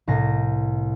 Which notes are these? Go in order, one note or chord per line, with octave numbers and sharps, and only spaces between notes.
C2 A2 C4 A#6